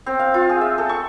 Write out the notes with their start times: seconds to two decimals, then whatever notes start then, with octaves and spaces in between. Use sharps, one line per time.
0.06 C4
0.19 F5
0.34 F4
0.49 G#4
0.61 E5
0.78 A4
0.89 C#6